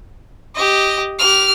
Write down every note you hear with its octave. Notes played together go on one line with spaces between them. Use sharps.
G4 D#5
G4 F6